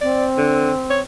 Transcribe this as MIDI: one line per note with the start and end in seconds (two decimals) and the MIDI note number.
0.01 1.01 60
0.01 0.25 74
0.38 0.72 50
0.90 1.00 73